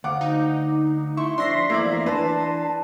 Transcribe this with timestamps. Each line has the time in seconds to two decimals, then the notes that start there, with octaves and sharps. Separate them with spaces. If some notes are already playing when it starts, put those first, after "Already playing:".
0.04 D2 F5 F#5 D6
0.21 D#4
1.17 E4 C6 C#6
1.38 F3 D4 E5 C6 A#6 C7
1.70 E2 F3 A3 A#3 E4 D5
2.06 E3 D4 B4 A5